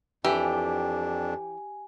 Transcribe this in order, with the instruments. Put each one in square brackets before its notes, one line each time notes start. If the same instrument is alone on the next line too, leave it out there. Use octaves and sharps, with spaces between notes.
[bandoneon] F2 D4 [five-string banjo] E3 [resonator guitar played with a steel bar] G4 [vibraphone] G#5